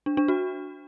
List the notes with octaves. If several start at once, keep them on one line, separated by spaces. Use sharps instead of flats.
D4
D4
F#4